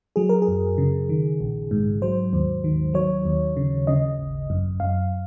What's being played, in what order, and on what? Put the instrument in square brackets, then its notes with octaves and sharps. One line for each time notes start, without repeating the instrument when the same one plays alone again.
[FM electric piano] F#3 G#4
A#4
G#4
F#2
C#3
D#3
A#1
G#2
F#3 C5
D#2
D#3
F#3 C#5
D#2
C#3
C#3 D#5
G#1
F#2
F#2 F5